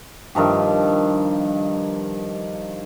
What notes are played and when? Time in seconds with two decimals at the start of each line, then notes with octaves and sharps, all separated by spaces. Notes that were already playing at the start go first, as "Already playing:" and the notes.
0.35 G2 D#3 F3 G4